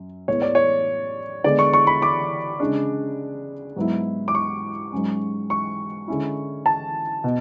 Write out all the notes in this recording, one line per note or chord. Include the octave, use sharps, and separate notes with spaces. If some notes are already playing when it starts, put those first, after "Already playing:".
Already playing: F#2
A2 G#3 B3 C#5
D5
C#5
D3 G#3 B3 D5
C#6
C#6
B5
D6
C#3 G#3 D4
G#2 F#3 B3 E4
D6
C#6
G#2 F#3 C#4
C#6
D3 G#3 C#4 E4
A5
B2